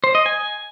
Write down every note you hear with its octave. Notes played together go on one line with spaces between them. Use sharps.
C5
D#5
G#5